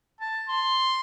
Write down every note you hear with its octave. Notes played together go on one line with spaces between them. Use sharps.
A5
C6